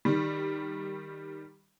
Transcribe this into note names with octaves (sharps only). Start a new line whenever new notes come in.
D#3 G3